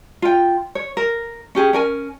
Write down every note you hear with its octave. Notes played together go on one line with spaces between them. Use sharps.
F4 G5
C#5
A#4
C#4 G4 G#4
C#4 A#4 G#5